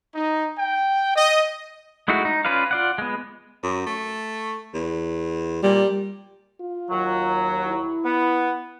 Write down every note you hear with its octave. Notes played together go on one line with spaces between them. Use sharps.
D#4
G5
D#5
G#3 A3 D#4 E4 F#4
D#4
C#4 F4 B4 D5 F5
F4 D5 F#5
G#3 B3
F#2
A3
E2
A#2 G3
F4
D#2 F#3
E4
B3